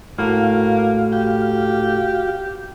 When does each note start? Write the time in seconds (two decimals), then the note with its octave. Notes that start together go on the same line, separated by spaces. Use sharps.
0.19 A2 A#3 F#4 F5
1.12 G4